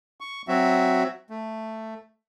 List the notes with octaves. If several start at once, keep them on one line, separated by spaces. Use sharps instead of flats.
C#6
F#3 C4 F#4 E5
A3